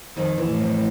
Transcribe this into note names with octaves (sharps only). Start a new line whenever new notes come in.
F2 D#3
E3
A2
F2